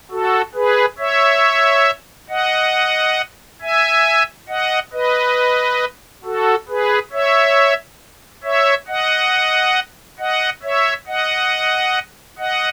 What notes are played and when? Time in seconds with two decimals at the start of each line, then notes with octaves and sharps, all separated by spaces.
0.11 F#4 A4
0.55 G#4 B4
0.98 C#5 E5
2.30 D#5 F#5
3.61 E5 G#5
4.49 D#5 F#5
4.93 B4 D#5
6.24 F#4 A4
6.68 G#4 B4
7.12 C#5 E5
8.44 C#5 E5
8.88 D#5 F#5
10.19 D#5 F#5
10.63 C#5 E5
11.07 D#5 F#5
12.38 D#5 F#5